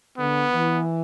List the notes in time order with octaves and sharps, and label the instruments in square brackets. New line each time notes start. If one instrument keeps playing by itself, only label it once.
[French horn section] D3 [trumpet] B3
[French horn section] E3